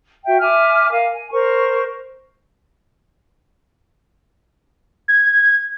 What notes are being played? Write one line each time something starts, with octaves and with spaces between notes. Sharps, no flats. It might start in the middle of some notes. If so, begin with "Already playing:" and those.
F#4 E5 G5
E5 G#5 D6 F6
A#4 F5 G#5
G#5
A#4 C5 C#6
G#6